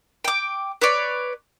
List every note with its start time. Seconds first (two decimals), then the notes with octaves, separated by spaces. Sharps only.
0.24 G5 D6
0.82 B4 C#5 D5